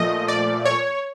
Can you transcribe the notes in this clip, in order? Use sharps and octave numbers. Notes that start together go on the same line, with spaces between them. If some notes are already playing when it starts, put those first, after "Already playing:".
Already playing: A#2 F3 A3 D#5
D5
C#5